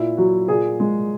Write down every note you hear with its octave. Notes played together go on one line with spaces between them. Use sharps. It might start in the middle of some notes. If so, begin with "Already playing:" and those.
Already playing: A#2 E4
F#3 F#4
A#2 G#4
G#3